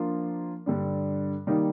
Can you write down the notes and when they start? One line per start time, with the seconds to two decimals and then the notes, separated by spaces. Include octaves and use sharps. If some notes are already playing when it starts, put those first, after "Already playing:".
Already playing: F3 A#3 D4 F4
0.66 G2 D3 G3 D4
1.47 D#3 G3 A#3 D#4